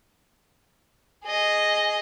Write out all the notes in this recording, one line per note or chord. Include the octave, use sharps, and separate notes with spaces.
G#4 D#5